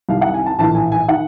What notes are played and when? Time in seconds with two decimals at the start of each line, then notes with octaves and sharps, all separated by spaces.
0.09 C2 C3 D#3 F5
0.21 F#5
0.34 G#5
0.46 A5
0.59 A#1 A2 E3 A5
0.75 G#5
0.92 G#5
1.08 D#3 F#5